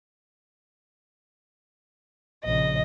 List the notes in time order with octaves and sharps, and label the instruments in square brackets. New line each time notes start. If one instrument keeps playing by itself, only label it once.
[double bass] A#1 C#3 [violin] D#5